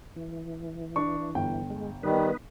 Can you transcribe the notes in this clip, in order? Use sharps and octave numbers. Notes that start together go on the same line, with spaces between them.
E3
D4 C#6
G1 G5
G#3
D#3 G3 B3 D#4 B4